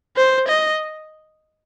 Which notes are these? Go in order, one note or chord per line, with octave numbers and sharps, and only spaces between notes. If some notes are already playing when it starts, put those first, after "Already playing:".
C5
D#5